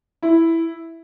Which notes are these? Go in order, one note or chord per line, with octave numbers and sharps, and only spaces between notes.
E4